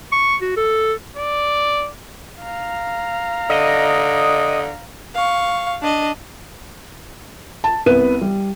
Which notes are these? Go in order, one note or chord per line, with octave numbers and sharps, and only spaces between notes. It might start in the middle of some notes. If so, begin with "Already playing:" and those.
C#6
F#4
A4
D5
F5 A#5
D3 D#5
F5 C#6
D4 D#5
A5
C2 B3 B4 D#7
G3